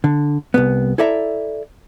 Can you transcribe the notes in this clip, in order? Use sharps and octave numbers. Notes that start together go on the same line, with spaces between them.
D3
C2 F#2 B3
E4 A4 D5 E5 A#5